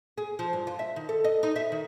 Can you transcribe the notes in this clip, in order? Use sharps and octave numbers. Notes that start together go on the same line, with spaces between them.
G#4
F3
G2
F4
E5
D#3
A4
D#5
D#4
E5
D#3